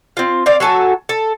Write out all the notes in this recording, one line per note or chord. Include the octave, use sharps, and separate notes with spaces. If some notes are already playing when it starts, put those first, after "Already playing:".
C4 F4
C4 D5 F5
F#3 F#4 A4 G#5
A4